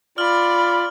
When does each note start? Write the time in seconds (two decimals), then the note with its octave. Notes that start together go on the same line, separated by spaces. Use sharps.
0.18 F4 D5 B5 F6 F#7